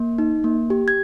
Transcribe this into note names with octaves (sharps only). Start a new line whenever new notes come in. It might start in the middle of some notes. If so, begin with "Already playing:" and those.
Already playing: A#3
D#4
A#3
G4
G#6